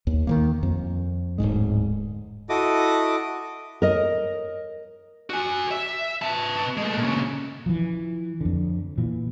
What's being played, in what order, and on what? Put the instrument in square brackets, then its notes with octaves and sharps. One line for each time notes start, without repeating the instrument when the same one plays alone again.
[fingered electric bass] D#2
D#3 E3 A#3
F2
D1 D#2 G#2 G#3
[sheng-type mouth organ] E4 F#4 A4 D#5 D6 D#6
[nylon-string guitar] A#4 D#5
[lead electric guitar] F#4 G#5
E5
B3 A5
G#3 A3
A#2 C#3
[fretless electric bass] E3 F3
F2 D3
A#2 E3